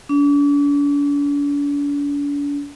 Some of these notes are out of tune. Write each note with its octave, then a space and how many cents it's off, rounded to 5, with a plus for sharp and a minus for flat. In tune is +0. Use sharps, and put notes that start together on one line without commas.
D4 -40